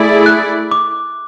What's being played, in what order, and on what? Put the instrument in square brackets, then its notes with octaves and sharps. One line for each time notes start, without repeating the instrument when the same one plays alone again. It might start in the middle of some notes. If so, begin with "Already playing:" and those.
Already playing: [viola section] A3 E4 G#4 D5
[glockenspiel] F#6
D6